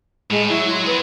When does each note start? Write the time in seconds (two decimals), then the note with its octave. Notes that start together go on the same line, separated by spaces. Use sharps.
0.31 A2 G#3
0.49 F#3 E4
0.70 C6
0.86 B3 G#4 B4